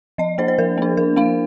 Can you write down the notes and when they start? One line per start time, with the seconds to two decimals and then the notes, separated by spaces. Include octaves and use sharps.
0.18 F3 D#5
0.38 A#3 D4 C5
0.48 C5
0.59 F3 A#4
0.78 A#3 D4
0.97 F3 A#4
1.16 A#3 D4 F5